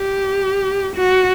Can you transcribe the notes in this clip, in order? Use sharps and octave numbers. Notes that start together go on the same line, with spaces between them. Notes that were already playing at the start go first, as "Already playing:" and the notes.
Already playing: G4
F#4